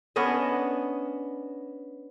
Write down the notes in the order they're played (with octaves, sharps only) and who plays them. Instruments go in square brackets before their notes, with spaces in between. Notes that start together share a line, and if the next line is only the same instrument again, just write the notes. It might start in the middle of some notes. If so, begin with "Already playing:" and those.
[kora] B3 C#4 D4 D#5